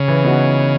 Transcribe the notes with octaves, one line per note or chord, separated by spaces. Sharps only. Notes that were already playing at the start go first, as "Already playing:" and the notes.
Already playing: C#3
E3
B3 D#4 F#4